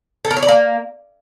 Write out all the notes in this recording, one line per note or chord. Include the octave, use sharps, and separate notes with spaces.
A4
A#4
C#5
D5
A#3